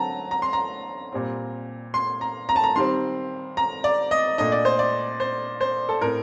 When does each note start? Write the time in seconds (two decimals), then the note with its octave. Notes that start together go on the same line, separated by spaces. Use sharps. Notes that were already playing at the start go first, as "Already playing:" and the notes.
Already playing: D3 F#3 C4 A5 A#5
0.31 A#5
0.42 C6
0.53 A#5
1.12 A#2 G3 C4
1.94 C6
2.21 A#5
2.49 A#5
2.56 A5
2.64 A#5
2.76 D#3 G3 C4 C6
3.57 A#5
3.84 D5
4.11 D#5
4.38 A#2 A3 D4 D#5
4.52 D5
4.65 C5
4.79 D5
5.20 C5
5.61 C5
5.89 A4
6.01 A2 A3 C4 A#4